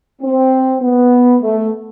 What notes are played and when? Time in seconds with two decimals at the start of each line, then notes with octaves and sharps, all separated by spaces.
0.22 C4
0.81 B3
1.42 A3